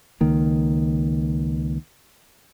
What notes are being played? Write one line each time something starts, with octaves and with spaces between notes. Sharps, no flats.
C#2 D#3 A#3